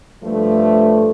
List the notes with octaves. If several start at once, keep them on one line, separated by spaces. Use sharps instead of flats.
G2 F3 A3